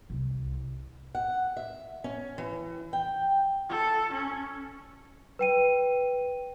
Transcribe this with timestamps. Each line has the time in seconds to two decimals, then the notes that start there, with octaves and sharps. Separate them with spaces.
0.10 C2
1.15 F#5
1.57 E5
2.04 C#4
2.38 E3
2.93 G5
3.69 A4
4.13 C#4
5.39 B4 G5 D#7